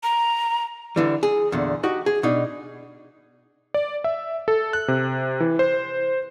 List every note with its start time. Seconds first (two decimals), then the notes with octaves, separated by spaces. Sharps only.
0.03 A#5
0.96 D3 E3 G3
1.23 G#4
1.52 E2 A#2 D3
1.83 D#4 F#4 G4
2.06 G#4
2.23 B2 D4 D#4
3.74 D5
4.04 E5
4.48 A4
4.73 F#6
4.88 C3
5.40 E3
5.59 C5